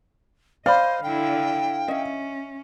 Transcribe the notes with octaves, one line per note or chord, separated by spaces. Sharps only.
C5 D5 D#5 F5 B5
D3 E4 G5
C#4 D#5 E5